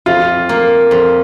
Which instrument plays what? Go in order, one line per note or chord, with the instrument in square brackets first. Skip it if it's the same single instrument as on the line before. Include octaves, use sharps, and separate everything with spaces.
[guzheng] F2 [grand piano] F4
[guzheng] A#3
F2